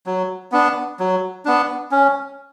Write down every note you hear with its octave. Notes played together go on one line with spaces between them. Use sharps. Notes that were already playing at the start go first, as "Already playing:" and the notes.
F#3
B3 D4
F#3
B3 D4
C#4